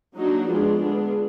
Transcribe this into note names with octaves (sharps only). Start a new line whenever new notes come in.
F#3 A#3 D4 D#4 F#4
F3 G#3 B3 D4 F4 G#4
D3 G#3 B3 D4 F4 G#4